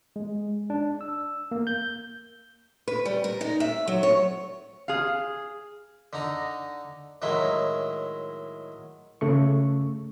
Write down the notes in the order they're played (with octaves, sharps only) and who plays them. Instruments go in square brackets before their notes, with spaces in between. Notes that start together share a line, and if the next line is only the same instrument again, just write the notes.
[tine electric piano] G#3
D4
E6
A#3
G6
[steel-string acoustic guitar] B4
G3
A#4
D#4
E5
F#3
C#5
[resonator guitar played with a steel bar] G#4 F5
[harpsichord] D3 D#4 A#5
A2 D#3 F#3 G#3 E4
[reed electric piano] C#3 A3 C#6